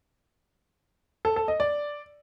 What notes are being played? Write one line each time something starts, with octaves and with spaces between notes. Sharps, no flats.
A4
A4
D#5
D5